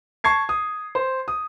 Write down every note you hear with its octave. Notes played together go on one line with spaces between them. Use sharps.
A5 C#6 G#6 C7
D#6
C5
D#6